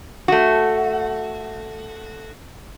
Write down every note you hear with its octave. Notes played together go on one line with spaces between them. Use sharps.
A3 F#4